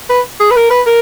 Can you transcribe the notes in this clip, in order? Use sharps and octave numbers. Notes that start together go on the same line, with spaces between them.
B4
G#4
B4
A#4
B4
A#4